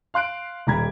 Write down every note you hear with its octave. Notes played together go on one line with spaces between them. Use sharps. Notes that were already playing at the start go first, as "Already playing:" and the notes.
F5 C6 F#6 D7
D#1 G3 A#5 B5 G#6